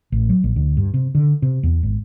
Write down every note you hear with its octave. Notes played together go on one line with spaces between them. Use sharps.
A1
F#3
A#1
D2
G2
C3
D3
C3
E2
G#1